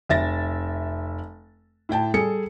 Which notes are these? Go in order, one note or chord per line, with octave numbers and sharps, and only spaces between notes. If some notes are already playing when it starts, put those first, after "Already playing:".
F1 E5 A6 A#6
A2 E4 G5 A5
G3 G#4 A4 C#7